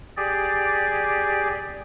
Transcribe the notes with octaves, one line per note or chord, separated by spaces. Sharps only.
G4 G#4 D5